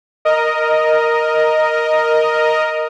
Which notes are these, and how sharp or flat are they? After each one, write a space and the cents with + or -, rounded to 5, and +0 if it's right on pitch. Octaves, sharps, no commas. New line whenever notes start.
A#4 +0 D#5 +0